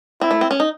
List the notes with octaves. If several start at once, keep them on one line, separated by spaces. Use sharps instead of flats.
C4 E4
A3
C4
C#4
D#4